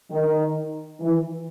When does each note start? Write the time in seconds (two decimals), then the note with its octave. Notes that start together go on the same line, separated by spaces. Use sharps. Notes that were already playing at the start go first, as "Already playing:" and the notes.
0.11 D#3
1.00 E3